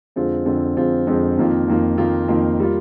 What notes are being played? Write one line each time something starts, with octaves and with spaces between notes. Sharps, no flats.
F2 D3 G#3 C4 F4
F2 D3 G#3 C4 F4
F2 D3 G#3 C4 F4
F2 D3 G#3 C4 F4
F2 D#3 A#3 F4
F2 D#3 A#3 F4
F2 D#3 A#3 F4
F2 D#3 A#3 F4
G3 A#3 F4